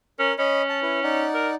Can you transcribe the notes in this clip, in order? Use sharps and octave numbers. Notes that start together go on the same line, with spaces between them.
C#4 A#4
C#4 C#5 D#5 B5
A5
E4 B4
D#4 D5 F#5
A#4